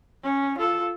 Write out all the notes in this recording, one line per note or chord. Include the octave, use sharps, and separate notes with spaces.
C#4
F4 A4